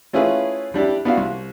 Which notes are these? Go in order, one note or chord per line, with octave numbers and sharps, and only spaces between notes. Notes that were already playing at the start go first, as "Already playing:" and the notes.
A3 C#4 E4 F4 G#4 B4
G3 D4 E4 G4
B3 D4 E4 F#4 F5
C2